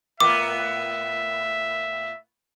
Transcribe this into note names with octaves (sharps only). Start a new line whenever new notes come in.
A2 A#3 B3 E5 D6